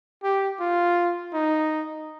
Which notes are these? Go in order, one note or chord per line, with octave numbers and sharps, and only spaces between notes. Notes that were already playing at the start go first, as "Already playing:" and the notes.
G4
F4
D#4